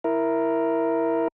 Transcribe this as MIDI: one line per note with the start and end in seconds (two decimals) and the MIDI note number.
0.04 1.28 64
0.04 1.28 70